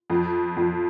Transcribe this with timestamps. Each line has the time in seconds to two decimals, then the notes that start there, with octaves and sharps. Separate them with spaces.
0.10 F2
0.57 F2